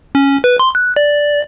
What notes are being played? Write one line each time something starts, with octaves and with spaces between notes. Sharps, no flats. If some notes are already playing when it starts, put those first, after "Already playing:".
C#4
B4
C6
F#6
D5